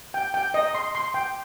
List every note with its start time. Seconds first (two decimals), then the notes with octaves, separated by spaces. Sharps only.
0.14 G5
0.34 G5
0.54 D#5
0.75 C6
0.95 C6
1.14 G5